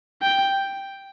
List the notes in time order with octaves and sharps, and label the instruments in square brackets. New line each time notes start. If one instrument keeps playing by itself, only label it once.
[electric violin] G5